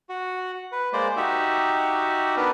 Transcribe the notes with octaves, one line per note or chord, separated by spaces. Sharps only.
F#4
B4
G#3 A#3 C5 D5
D#4 F#4 G4 E5
B3 D4 A#4 B4